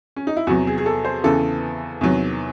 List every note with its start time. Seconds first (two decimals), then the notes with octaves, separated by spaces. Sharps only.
0.16 C#4
0.27 D#4
0.37 E4
0.47 E2 C3 F#3 F#4
0.67 G#4
0.78 G#4
0.86 A4
1.05 C5
1.24 E2 C#3 E3 A4
2.01 E2 C3 D#3 F#3